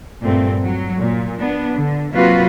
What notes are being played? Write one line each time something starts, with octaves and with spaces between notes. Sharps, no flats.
G2 A#2 A3 C4
F#3
A#2
B3 D4
D3
C3 F#3 A#3 F4 F#4 B4